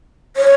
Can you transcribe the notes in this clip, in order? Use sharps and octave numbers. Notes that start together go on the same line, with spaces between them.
C#5